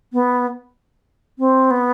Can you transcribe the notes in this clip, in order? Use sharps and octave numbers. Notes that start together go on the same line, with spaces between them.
B3
C4
B3